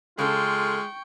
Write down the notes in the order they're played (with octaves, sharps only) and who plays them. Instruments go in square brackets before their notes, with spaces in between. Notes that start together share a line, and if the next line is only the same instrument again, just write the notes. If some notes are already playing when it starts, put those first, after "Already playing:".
[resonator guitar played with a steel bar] C#3 A4 [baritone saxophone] G#3 [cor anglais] F4 [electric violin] G5 C#6